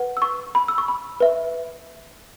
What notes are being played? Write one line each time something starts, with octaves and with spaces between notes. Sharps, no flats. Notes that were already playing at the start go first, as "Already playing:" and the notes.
Already playing: B4 F#5
E6
C#6
B5
E6
C#6
B5
B4 E5